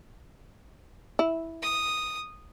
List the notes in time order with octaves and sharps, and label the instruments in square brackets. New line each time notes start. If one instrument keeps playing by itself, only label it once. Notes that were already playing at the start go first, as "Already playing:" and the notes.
[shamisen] E4
[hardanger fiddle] D#6